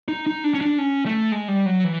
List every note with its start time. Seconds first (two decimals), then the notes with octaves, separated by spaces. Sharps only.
0.08 D#4
0.27 D#4
0.44 D4
0.54 C#4
0.61 D4
0.78 C#4
1.06 A3
1.32 G#3
1.48 G3
1.66 F#3
1.84 E3